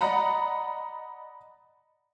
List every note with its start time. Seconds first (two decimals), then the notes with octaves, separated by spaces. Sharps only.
0.01 D5 D#5 F#5 A#5 B5